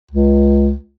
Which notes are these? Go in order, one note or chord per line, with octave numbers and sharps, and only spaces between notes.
C#2